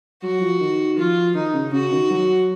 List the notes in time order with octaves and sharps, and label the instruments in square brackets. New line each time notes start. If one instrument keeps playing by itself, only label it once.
[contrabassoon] F#3 [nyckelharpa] F#4
[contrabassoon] F3
D#3
[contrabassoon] F3 [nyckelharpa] F4
[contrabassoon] D#3 [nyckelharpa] D#4
[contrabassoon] C#3
[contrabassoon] C#3 [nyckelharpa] F#4
[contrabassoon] D#3
F#3